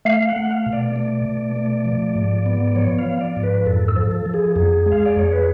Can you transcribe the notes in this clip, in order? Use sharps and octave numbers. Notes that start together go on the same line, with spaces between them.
A3 F5
F#5
A3
F5
B2
D5
A3
B2
A3
F3
G#2
B3
F3 C#5
F5
F3
D5
G#2
B4
F2 A4
A4
F3
A4
F3
G#4
F2 G#4
G#3
F5
D5
F2 C#5
B4